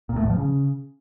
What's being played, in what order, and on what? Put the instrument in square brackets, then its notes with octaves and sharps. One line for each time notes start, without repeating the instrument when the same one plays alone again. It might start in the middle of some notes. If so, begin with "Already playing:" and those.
[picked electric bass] A#2
A2
E2
F3
C#3